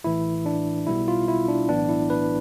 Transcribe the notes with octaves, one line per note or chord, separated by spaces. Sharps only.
A1 A2 E3 E4
D4
B1 B2 G3 B3 E4
F4
E4
D4
B1 A2 E3 B3 D4
E4
B4